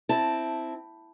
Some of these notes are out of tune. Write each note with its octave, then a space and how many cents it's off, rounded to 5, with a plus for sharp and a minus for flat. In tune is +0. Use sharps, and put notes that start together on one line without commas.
C4 +0 E4 +0 A5 -5